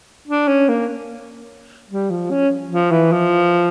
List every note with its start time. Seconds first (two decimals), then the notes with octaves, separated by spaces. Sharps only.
0.28 D4
0.48 C#4
0.69 A#3
1.89 G3
2.11 F3
2.31 C#4
2.71 F3
2.91 E3
3.12 F3